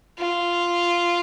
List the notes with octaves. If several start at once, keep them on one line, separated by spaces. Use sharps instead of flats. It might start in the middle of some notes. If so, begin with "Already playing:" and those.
F4